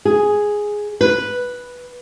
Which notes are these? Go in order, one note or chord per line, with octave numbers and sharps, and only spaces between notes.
G#4
B4